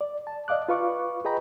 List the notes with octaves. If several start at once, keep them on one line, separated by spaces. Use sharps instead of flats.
D5
A5
D5 D#5 F5 D6 F#6
F4 B4 F5 C#6 D6
G#4 B4 D#5 G5 A#5 B5